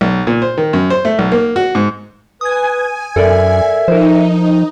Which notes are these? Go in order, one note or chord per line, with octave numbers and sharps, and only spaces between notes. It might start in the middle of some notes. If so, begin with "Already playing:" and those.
B1
A#2
C5
D#3
F#2
C5
A3
B1
A#3
F#4
G#2
B4 G#5 D#6 G#6
F#2 A4 A#4 D5 E5
F3 D#4 A#4 C5